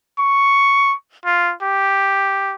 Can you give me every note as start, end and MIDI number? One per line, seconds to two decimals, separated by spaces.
0.19 0.94 85
1.25 1.54 65
1.62 2.55 67